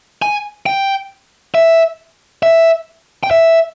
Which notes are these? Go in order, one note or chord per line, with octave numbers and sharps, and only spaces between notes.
G#5
G5
E5
E5
G5
E5